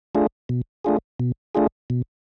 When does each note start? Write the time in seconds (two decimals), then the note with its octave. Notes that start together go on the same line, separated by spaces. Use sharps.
0.15 A3 D4 F4 G#4
0.49 B2
0.85 A3 D4 F4 G#4
1.20 B2
1.55 A3 D4 F4 G#4
1.90 B2